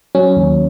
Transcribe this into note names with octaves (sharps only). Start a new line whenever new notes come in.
F#3 C#4
D#2